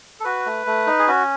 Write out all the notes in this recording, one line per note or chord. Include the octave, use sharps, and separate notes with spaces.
A4
F#4 B4
A3
A3
D#4
G#4
C#4 F#4